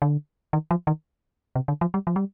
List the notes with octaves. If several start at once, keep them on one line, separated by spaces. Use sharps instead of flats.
D3
D#3
F3
D#3
C3
D3
F3
G3
F3
G3